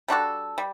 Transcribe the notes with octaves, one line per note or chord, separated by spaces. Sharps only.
G3 D4 F#4 A4
G3